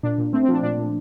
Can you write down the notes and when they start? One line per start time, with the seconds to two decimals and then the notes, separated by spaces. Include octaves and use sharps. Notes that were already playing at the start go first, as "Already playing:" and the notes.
0.03 A#2 D4
0.18 A#2
0.33 A3 C4
0.43 C4
0.48 F3 D4
0.63 A#2 D4
0.78 A#2